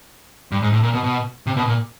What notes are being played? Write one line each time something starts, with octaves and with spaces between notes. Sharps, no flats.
G2
G#2
A2
A#2
B2
B2
C3
B2
A#2